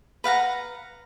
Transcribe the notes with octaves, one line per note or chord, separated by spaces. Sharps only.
B4 F5 F#5 A#5